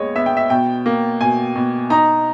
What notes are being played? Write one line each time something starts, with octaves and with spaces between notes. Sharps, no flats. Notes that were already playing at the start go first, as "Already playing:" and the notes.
Already playing: D#2 G#3 B3 C#5 D#5
B3 E5
G5
E5
B2 G5
A#3
B2 G#5
B2
D#4 A#5